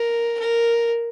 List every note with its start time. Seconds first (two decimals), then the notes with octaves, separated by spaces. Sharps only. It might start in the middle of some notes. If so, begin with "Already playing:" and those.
Already playing: A#4
0.39 A#4